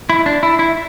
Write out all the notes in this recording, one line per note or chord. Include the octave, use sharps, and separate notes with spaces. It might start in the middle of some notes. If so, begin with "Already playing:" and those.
E4
D4
E4
E4